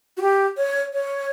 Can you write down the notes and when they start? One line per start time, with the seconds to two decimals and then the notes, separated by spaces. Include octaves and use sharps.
0.17 F#4
0.21 G4
0.57 C#5
0.93 C#5